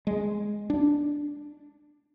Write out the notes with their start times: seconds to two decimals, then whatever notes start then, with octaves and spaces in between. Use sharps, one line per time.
0.07 G#3
0.70 D4